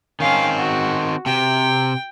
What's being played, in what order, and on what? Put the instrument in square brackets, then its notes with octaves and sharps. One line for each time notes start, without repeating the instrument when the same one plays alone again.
[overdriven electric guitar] D#3 C4 [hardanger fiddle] C#4 F5
[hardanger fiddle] F#4
[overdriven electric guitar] C3 [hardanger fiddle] G5